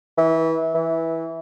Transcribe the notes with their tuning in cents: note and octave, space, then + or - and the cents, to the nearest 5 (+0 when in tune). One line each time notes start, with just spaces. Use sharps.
E3 -25
E3 -15